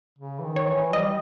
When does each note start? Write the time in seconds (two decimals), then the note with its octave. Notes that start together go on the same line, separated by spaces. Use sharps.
0.18 C#3
0.39 E3
0.44 D#3
0.56 C#5
0.68 E3
0.93 G3 D#5